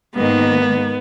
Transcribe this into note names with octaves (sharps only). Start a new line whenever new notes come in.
G#2 D#3 A#3 B3